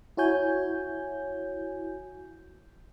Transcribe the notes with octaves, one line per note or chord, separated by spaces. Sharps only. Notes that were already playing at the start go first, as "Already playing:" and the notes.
E4 F#4 C#5 G#5 G6